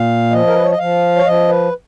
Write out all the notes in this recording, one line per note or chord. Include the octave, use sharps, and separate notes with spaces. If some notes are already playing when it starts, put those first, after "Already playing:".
Already playing: A#2 F5
F3 D#5
A#4
B4
C#5
D#5
F3 F5
C#5
F3 D#5
B4